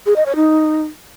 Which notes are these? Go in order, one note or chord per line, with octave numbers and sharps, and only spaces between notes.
G#4
D#5
C#5
D#4